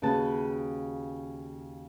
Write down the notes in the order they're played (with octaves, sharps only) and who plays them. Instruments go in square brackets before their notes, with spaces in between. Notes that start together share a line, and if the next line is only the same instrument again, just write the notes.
[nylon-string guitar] D#2 C#3 F#4 B4 A5